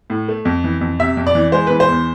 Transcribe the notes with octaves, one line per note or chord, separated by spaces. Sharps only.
A2
A3
F2
E3
F2
C3 E5
F2
D5
E3
G#3 C5
E3 B4
C5
E2